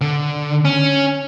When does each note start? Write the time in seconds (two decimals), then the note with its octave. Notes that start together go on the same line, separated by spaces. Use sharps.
0.01 D3
0.65 C#4